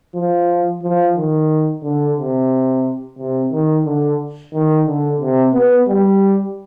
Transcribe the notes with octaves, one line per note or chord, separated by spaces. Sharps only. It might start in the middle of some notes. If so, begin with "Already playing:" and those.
F3
F3
D#3
D3
C3
C3
D#3
D3
D#3
D3
C3
B3
G3